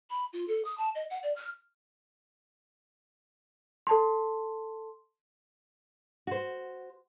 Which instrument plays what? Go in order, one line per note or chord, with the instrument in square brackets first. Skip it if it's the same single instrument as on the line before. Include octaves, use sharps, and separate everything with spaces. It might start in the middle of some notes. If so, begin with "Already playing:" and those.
[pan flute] B5
F4
A4
D#6
A5
D#5
F#5
D5
F6
[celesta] A4 A5 C6
[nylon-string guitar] F#4 C5